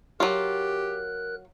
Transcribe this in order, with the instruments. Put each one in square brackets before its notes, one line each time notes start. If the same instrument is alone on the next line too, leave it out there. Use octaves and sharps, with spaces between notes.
[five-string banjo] F#3 F4 [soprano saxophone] G4 [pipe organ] A#4 F#6